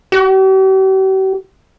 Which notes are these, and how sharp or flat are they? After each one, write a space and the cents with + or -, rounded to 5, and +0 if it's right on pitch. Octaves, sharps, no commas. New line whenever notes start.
G4 -45